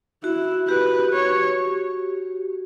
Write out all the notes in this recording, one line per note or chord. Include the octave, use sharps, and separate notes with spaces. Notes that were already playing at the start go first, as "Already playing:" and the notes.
E4 F#4
G4 B4
C#5